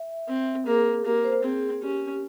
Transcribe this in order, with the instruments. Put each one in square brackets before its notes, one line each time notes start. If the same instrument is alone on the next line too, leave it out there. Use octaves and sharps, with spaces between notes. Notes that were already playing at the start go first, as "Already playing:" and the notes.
Already playing: [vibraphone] E5
[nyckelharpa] C4
[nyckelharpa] A#3 [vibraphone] G#4
[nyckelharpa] A#3 [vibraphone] G4
[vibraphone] C5
[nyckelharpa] C4 [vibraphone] G#4
[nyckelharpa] C#4 [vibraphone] G4